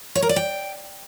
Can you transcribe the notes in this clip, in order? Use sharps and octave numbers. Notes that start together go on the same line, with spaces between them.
C#5
A#4
D5
G5